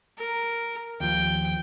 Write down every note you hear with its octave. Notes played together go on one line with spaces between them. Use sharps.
A#4
D#2 F3 G5